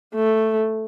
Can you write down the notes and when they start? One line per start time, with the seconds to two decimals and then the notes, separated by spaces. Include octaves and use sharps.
0.15 A3